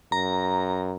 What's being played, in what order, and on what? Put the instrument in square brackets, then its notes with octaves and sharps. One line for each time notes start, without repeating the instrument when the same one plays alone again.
[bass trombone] F#2 [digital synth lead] A#5